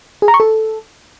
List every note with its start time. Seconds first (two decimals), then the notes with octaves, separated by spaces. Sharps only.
0.22 G#4
0.28 A#5
0.34 C#6
0.40 A4